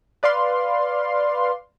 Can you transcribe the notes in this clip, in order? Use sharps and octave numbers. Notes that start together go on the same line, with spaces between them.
B4 D5 F5 C6